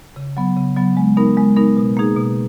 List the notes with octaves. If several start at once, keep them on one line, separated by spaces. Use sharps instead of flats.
C#3
F#3 B3
C#3
F#3 B3
G#3
B3 D#4 A#4
G#3
B3 D#4 A#4
B2
A#3 D#4 G#4
B2